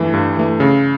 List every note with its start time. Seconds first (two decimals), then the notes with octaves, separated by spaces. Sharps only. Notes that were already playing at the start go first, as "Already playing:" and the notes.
Already playing: G2 E3 A3
0.14 G2
0.37 E3 A3
0.60 C#3